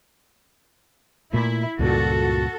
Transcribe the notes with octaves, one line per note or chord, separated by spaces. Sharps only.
A#2 A3 E4
C#2 G2 A#2 F#4 A4